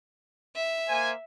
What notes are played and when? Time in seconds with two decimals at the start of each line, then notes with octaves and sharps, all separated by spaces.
0.55 E5
0.89 A#3 C5 G#5